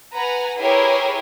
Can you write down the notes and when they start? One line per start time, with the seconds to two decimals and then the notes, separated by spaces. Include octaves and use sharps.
0.12 B4 F#5 G#5 A#5
0.59 E4 G4 G#4 A#4 B4 C#5